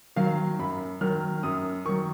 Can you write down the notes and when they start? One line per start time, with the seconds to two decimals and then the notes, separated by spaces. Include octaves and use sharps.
0.16 D#3 F#3 F5
0.59 F#2 B5
1.01 D#3 F#3 F6
1.43 F#2 D#6
1.85 D#3 F#3 C#6